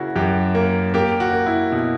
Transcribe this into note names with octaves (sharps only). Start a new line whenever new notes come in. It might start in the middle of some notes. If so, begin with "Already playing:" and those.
Already playing: C#3 A#3 E4 F#4
F#2 G4
A#3
A#3 G4
F#4
A#3
E4
B2 F#4